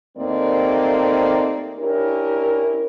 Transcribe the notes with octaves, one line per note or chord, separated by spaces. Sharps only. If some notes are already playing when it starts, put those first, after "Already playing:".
D#2 A3 A#3 C4 D#4 D5
C#4 D4 E4 G4 A#4